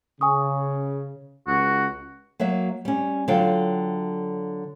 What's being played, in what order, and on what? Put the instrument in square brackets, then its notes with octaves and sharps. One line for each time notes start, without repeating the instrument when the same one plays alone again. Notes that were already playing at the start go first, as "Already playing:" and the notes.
[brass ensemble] C#3 [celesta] G#5 C#6 D#6
[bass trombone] C#2 [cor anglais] F#4
[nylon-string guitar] F#3 A#3 F#4 E5
G3 C#4
D3 F#3 F4 A4 F5 G5